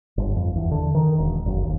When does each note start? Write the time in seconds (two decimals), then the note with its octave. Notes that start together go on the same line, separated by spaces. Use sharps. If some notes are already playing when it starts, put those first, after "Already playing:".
0.18 G1
0.36 F2
0.56 E2
0.71 D3
0.95 D#3
1.19 E1
1.46 F#1
1.63 D#2